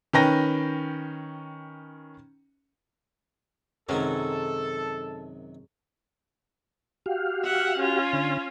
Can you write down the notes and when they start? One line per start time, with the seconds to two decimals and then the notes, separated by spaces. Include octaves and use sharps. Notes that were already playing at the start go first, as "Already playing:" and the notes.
0.13 D#3 C#4 B4 G5 A#6
3.89 F#2 C3 D#3 F#3 G#3 C#4 A4
7.06 F#4 G4 F5
7.44 E5 F#5
7.78 C#4 F4
8.13 D3